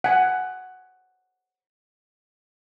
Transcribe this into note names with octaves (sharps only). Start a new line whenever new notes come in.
F#5 G#5